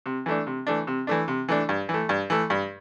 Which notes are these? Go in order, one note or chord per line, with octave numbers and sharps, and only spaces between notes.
C3
E3 A3 D4
C3
E3 A3 D4
C3
E3 A3 D4
C3
E3 A3 D4
G2
E3 A3
G2
E3 A3
G2